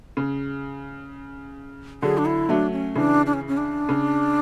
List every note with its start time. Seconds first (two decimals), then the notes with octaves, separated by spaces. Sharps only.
0.17 C#3
2.02 D3 F#3 G#4
2.18 D4
2.25 E4
2.49 F#3 A3 D4
2.72 C#4
2.96 C#3 E3 D4
3.26 D4
3.33 C#4
3.48 C#4
3.57 D4
3.89 C#3